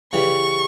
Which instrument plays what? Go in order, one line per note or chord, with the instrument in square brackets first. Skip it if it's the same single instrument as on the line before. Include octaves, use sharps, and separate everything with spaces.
[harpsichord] C#3 E3 G3 [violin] C#6